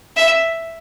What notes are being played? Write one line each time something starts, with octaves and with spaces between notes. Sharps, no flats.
E5